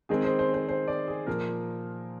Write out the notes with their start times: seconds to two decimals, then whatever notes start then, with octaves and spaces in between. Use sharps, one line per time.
0.09 D#3 G#3 C4 G#4
0.24 C5
0.39 C5
0.54 C5
0.69 C5
0.88 D5
1.08 G#4
1.27 A#2 F3 A#3 A#4